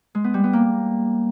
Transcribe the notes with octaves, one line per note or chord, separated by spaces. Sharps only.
G#3
B3
G3
B3
A#3